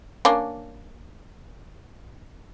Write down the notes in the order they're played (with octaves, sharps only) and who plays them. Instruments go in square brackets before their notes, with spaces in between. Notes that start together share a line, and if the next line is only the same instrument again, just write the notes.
[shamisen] A#3 C#4 D4